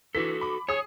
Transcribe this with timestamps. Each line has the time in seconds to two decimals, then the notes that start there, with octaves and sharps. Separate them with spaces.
0.15 E3 F#4 A4 B6
0.41 B5 D6
0.68 G#4 C#5 D#6